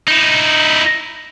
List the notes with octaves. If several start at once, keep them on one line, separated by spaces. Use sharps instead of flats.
D#4 E4